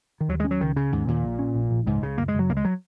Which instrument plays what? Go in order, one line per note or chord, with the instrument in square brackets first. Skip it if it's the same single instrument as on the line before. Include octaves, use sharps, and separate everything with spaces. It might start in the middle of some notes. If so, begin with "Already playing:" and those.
[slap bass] D#3
[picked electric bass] D#2 [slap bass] F#3
[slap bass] G#3
[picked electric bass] C#4
[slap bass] F#3
[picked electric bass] C#2 [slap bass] D#3
[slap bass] C#3 [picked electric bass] C#4
[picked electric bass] D#2 [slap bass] G#2
[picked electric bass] D#2 [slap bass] A#2
[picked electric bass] A#1
C#4
A#1
A#1
[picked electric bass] C#2 [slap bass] G#2
[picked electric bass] C#2 [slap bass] C#3
[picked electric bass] F#1 [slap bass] A#3
[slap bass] G#3
[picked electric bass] F#1 [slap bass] F#3
[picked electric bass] C#2 [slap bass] A#3
[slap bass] G#3
F#3